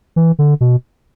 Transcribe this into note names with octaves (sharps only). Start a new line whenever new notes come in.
E3
D3
B2